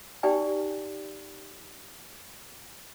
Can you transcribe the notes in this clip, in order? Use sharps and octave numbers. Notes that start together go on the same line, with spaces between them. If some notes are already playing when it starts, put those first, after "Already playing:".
D#4 G4 D5 G5 G#5